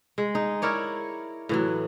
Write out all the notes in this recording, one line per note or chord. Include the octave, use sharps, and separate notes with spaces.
G#3
D#4
E4 A#4 C#5 D5
A2 E3 F#3